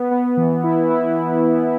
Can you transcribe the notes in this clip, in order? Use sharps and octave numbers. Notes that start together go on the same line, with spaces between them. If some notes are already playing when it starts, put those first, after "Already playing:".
Already playing: B3
B3
E3
E4
E4